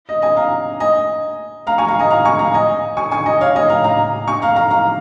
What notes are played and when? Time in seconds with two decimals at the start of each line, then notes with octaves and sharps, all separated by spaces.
0.09 D#5
0.22 D#5 G#5
0.37 F5 A#5
0.80 D#5 G#5
1.67 F5 A#5
1.78 G#5 C#6
1.88 F5 A#5
2.00 D#5 G#5
2.11 F5 A#5
2.25 G#5 C#6
2.39 F5 A#5
2.54 D#5 G#5
2.97 G#5 C#6
3.11 G#5 C#6
3.26 D#5 G#5
3.41 C#5 F5
3.56 D#5 G#5
3.70 F5 A#5
3.84 F5 A#5
4.28 G#5 C#6
4.42 F5 A#5
4.56 F5 A#5
4.71 F5 A#5